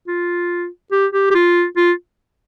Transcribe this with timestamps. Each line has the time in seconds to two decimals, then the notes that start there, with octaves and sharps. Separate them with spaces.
0.07 F4
0.92 G4
1.13 G4
1.31 G4
1.35 F4
1.77 F4